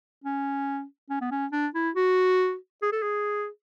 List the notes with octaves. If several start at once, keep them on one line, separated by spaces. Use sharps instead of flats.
C#4
C#4
B3
C#4
D4
E4
F#4
G#4
A4
G#4